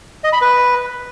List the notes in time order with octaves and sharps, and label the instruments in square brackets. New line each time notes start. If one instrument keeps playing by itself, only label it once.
[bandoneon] D#5
B5
B4